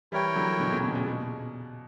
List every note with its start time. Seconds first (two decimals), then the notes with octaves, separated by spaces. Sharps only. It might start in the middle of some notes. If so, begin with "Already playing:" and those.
0.12 E3 G3 E4 A#4 C#5 G5
0.36 D3 F#3
0.59 B2 D3
0.71 A#2 C#3
0.84 B2
0.95 A#2 C#3
1.07 B2